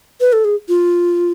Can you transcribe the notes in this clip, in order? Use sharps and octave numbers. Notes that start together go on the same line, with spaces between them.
B4
A4
G#4
F4